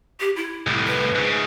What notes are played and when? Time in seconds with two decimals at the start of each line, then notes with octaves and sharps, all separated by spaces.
0.20 G4
0.36 E4
0.67 C2 A2
0.87 B4
1.15 G#2 C#3